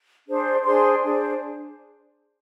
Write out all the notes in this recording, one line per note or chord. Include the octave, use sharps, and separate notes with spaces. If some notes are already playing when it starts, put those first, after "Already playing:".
D4 G#4 C5
D4 G#4 C5 C6
D4 G#4 C5